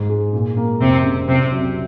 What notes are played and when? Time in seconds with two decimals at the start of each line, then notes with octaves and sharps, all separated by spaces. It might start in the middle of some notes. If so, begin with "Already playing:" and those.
Already playing: G#2
0.09 G#3
0.33 A#2
0.57 A#3
0.80 F1 C3 C4
1.03 C#3
1.27 C2 C3 C4
1.51 F#3